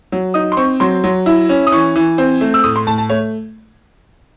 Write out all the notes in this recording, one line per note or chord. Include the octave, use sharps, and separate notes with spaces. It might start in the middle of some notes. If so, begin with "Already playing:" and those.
F#3
D#4 D#6
C6
C4 C#6
F#3 C6
F#3
E4
C#4
D#6
E3 C#6
E3
C4
A3
E6
A2 D#6
C6
A2 A5
A5
A3 C#5